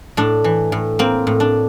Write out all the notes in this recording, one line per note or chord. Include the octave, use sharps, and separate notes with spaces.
A2 D4
E3
A2
A#3 C4
A2
D4